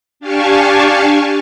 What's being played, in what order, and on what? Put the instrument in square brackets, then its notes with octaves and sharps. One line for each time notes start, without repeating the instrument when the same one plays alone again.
[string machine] D4 G4 F5 G#5 A5 C#6